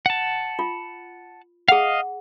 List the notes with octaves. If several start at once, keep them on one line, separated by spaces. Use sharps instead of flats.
F#5 A5
F4
G#4 D#5 F5 F#5